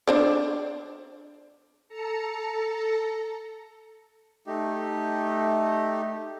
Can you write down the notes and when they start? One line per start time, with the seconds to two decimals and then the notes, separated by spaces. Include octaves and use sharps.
0.07 D4 C5 D5
1.88 A4 A5 A#5 C#7
4.46 A3 D#4 G4